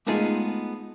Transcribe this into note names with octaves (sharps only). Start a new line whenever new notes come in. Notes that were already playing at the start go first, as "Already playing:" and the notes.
G#3 A3 B3 D#4 F4 G#4